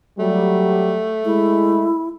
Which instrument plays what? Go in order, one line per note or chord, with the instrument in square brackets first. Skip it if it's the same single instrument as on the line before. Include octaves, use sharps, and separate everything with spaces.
[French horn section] F#3 G3 [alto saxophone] A3
[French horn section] G#3 [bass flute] E4